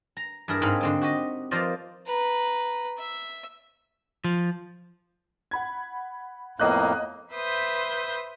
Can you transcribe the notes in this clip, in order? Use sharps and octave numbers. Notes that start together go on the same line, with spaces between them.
A#5
G2 E4 G#4 A#4 D5
G#2 C4 D#4 F5 B5
D3 C4 D#4
F#4 G4 D#5
F3 A#3 F4 C5 D5 D#5
B4 A#5
E5
F3
F#5 B5 G#6
F2 A2 A#3 B3 D#5 F#6
B4 C5 E5 D#6 G6